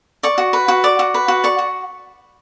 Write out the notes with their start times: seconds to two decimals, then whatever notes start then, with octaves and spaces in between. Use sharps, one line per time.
0.23 D5 C#6
0.38 F#4
0.53 B4
0.68 F#4
0.84 D5 D6
0.99 F#4
1.14 B4
1.28 F#4
1.44 D5 C#6
1.58 F#4